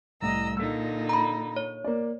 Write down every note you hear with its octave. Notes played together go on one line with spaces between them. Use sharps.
C2 A2 D#5 A#5 E6
A#2 D3 D#4 E6 B6
A#5 B5
C#5
A#3 D5